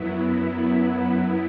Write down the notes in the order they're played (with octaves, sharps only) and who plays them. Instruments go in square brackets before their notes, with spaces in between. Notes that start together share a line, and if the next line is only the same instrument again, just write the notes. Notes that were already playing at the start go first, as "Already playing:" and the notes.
Already playing: [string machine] F#2 F#3 B3 E4